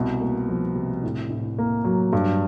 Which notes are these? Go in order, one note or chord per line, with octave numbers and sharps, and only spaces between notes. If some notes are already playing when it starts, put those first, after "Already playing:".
Already playing: C2 B2
A#3
F3
C3
A2
A2
A#3
F#3
G2